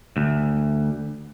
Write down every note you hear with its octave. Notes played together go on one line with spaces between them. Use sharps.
D2